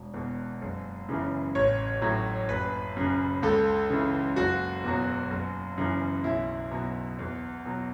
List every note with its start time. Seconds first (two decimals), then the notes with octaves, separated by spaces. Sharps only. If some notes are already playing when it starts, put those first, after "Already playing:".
Already playing: E1
0.14 E2 B2
0.62 F#1
1.08 F#2 C#3 E3
1.55 A1 C#5
2.02 A2 F#3
2.49 F#1 B4
2.96 F#2 C#3
3.43 C#2 A4
3.90 C#3 E3
4.36 F#1 F#4
4.84 E2 B2 F#3
5.31 F#1
5.78 F#2 C#3 E3
6.24 B1 E4
6.71 B2 F#3
7.19 E2
7.65 B2 F#3